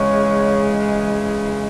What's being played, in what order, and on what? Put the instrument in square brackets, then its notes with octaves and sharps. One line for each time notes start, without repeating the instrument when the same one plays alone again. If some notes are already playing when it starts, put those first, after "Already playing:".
Already playing: [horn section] C#3 E3 G#3 [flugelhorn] C#5